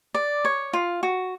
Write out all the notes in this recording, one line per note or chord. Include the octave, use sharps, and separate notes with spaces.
D5
C#5
F4
F#4